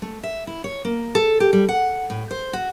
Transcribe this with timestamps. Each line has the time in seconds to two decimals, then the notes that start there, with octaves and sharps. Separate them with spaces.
0.02 A3
0.23 E5
0.47 E4
0.64 C#5
0.85 A#3
1.15 A4
1.40 G4
1.53 G3
1.69 F#5
2.10 A2
2.31 C5
2.53 F#4